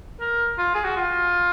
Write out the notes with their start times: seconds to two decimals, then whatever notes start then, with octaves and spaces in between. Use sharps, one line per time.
0.21 A#4
0.58 F4
0.75 G#4
0.85 F#4
0.96 F4